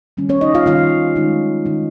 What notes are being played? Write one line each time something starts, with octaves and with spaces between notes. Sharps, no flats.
D#3 G3 C#4
C#4 C#5
D#4 D#5
F4 F5
D#3 G3 C#4 F4 F5
D#3 G#3 D#4
D#3 G#3 D#4